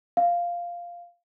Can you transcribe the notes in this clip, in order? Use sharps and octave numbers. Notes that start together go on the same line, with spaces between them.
F5